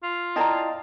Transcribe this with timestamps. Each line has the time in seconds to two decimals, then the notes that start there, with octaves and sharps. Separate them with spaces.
0.03 F4
0.36 E4 D5 D#5 G5 A5 A#5